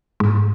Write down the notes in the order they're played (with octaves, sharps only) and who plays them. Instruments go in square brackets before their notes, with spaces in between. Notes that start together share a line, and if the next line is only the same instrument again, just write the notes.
[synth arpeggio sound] G#2